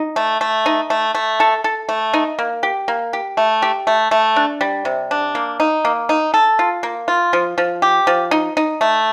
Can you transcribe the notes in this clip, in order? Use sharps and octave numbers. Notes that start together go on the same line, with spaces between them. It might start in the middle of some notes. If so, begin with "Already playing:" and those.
Already playing: D#4
A3
A3
D#4
A3
A3
A4
A4
A3
D#4
A#3
G4
A#3
G4
A3
G4
A3
A3
D4
G3
C3
D4
A#3
D#4
A#3
D#4
A4
F4
A#3
F4
F3
F3
G4
F3
D#4
D#4
A3